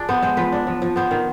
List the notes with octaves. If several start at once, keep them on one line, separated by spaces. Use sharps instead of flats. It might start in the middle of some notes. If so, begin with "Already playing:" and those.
Already playing: D4 F4 G#4
B3 C5
G#3 C5
F3 B4
D4
F3
F3
B3 C5
D#3